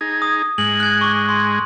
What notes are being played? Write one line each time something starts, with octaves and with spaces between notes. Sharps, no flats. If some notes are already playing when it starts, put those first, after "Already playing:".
D#4 G#4
D#6
G#2 G#3 F#7
F#6 G#6
C#6 D6 F#6
C6